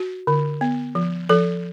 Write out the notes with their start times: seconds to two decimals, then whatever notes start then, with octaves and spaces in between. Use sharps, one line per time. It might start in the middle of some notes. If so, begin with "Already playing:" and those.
Already playing: F#4
0.27 D3
0.61 B3
0.95 F3
1.29 F3 A4